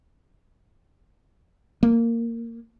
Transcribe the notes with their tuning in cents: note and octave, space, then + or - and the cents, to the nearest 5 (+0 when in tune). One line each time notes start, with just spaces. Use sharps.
A#3 -15